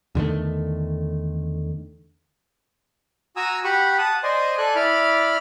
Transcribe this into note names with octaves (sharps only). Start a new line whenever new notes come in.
E2 D3 D#3 A3
F#4 G#5 A#5 D#6 E6
G4 F#5 B5 C#6
F#5 A5 D#6
C5 D5 D#5 G#5 C6
A4 D5 G#5 F#6
E4 D5 B5 F6